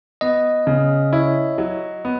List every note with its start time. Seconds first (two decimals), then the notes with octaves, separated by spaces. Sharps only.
0.21 B3 D#5
0.67 C#3
1.13 E4 C#5
1.58 F#3
2.05 B3